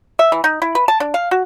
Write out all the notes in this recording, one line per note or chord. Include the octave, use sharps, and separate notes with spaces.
E5
E3
D#4
E4
B4
A5
D4
F5
F#4